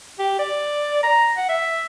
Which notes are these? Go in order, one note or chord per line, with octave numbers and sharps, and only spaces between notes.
G4
D5
A#5
F#5
E5